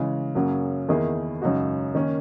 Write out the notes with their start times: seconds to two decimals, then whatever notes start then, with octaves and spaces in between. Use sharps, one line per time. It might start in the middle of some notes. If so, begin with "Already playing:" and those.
Already playing: C#3 E3 G#3
0.35 F#2 C#3 F#3 A#3
0.88 E2 D#3 A#3 E4 G#4
1.42 F#2 C#3 G#3 D#4 F#4
1.95 D#3 A#3 C#4